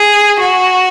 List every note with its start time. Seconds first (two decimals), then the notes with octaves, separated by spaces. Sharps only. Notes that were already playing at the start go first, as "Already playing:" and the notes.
Already playing: G#4
0.39 F#4